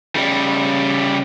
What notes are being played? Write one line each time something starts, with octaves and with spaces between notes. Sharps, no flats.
C#3 G3